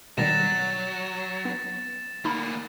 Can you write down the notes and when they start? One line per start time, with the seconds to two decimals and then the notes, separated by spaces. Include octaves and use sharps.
0.18 B2 D#3 F#3 G3 A6 A#6 E7
1.45 B3
2.25 D2 A#3 D#4 B5